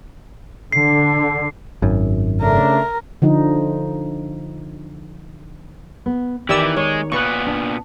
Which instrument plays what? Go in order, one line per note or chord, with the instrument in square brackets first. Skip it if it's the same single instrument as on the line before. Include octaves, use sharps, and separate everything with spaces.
[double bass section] D3 [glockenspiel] C7
[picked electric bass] G#1 F#2
[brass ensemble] C#3 A3 D4 [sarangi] A#4
[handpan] D3 F3 D#4
[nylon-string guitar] B3
[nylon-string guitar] D#3 [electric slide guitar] E3 E4 [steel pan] G4 D5 E6
[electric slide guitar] G#3 [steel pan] C#5
[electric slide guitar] A#2 B3 [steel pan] B4 C#6
[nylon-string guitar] D4